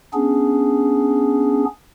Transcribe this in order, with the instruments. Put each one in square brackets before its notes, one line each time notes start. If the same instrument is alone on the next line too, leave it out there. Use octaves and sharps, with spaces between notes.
[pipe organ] B3 C#4 D4 G#4